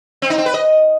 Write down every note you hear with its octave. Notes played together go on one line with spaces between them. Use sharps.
C4
D#4
C4
B4
D#5